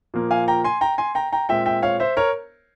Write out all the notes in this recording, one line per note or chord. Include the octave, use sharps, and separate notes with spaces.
A#2 F3 A#3
F5 G#5
G5 A#5
G#5 C6
G5 A#5
G#5 C6
G5 A#5
G5 A#5
A#2 G#3 C4 E5 G5
E5 G5
C#5 F5
C5 E5
A#4 C#5